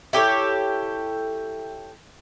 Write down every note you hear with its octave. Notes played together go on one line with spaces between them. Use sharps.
E4 G4 A4 C#5